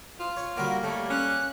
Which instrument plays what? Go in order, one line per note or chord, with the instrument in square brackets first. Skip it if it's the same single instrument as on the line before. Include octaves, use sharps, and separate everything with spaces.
[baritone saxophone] F4
[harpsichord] C#5
[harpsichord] D3 G3 F#4 [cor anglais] A#3 [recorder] A#4
[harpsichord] G3 [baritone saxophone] A3 [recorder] C#5
[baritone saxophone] C#4 [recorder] F#6